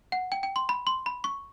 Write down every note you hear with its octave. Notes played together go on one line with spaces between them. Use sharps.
F#5
G5
G5
C6
B5
C6
B5
C#6